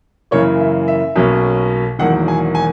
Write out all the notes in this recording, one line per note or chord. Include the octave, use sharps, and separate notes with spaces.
F#2 C#3 E3 A#3 C#5
E5
E5
B1 B2 A#3 C#4
E1 E2 D#3 F#3 A#3 F#5
G#5
G#5